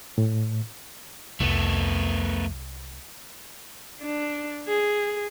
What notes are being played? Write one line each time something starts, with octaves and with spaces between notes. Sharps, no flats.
A2
C2 F2 A3 B3
D4
G#4